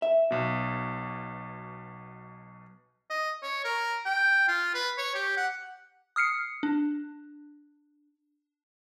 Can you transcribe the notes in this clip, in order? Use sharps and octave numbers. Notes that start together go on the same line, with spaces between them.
E5
B1 B2
D#5
C#5
A#4
G5
F4
B4
C#5
G4
F#5
D#6 F6 C7 C#7
D4